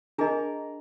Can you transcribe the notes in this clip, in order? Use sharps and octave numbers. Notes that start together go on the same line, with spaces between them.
D4 G#4 A#4 D#5